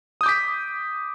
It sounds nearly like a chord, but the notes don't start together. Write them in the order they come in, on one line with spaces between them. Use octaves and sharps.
D#6 G6 D6 B6